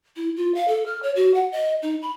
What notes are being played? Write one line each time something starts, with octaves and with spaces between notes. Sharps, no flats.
E4
F4
F5
A4
F6
C#5
F#4
F#5
D#5
D#4
B5